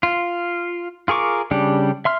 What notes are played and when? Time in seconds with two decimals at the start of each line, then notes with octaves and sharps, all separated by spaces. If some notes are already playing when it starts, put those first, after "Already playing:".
0.03 F4
1.08 F4 G#4 A#4 C#6 D6
1.51 C#3 G3 D4 G4
2.05 E5 C6 F6